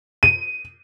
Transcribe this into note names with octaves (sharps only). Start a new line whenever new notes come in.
D#7